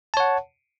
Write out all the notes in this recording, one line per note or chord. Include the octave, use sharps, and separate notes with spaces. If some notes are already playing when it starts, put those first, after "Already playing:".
C#5 F#5 A5